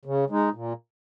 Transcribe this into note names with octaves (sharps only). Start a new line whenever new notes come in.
C#3
G#3 D#4
A#2